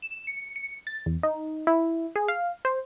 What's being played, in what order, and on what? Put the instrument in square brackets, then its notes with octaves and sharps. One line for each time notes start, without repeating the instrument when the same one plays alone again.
[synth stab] E7
C#7
C#7
A6
E2
D#4
E4
G#4
F5
C5